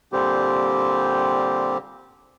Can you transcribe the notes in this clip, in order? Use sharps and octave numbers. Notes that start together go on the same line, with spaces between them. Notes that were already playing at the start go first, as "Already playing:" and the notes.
A#2 D3 G3 C4 G4